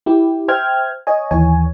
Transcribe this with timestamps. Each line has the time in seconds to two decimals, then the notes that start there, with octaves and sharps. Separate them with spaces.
0.06 E4 G4
0.48 C5 E5 G5 F6 G#6
1.07 C#5 D#5 G#5
1.31 D#2 E3 C#5 G#5